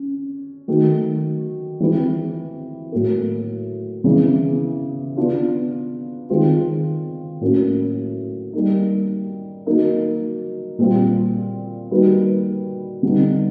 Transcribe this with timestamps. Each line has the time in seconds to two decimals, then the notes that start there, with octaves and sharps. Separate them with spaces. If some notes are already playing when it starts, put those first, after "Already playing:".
Already playing: C#4
0.68 D#3 F#3 A3
1.80 E3 G#3 C4 E4
2.92 A2 F#3 A#3
4.04 C#3 E3 G#3 B3
5.17 B3 D4 F4
6.30 D#3 G#3 C4 F4
7.41 A2 F#3 A#3 C#4
8.53 G3 A#3 D#4
9.66 F#3 A#3 D#4
10.79 A#2 G3 C4 F4
11.91 G3 A#3 D#4 F#4 B4
13.03 D3 G3 B3 D#4